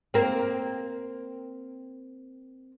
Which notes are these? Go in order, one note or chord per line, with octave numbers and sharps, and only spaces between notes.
A#3 C4